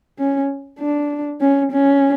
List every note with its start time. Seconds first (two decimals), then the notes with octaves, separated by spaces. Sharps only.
0.19 C#4
0.80 D4
1.41 C#4
1.72 C#4